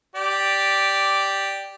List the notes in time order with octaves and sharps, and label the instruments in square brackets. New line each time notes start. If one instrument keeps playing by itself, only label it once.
[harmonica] G4 D5